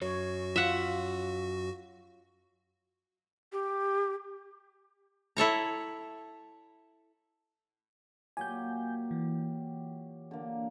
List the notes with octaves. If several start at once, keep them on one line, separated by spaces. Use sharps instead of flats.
F#2 F#4 C#5
F4 E5 F#5
G4
E4 A4 C#5 A#5
A#2 F#3 G4 G#5 G6
E3
D3 A#3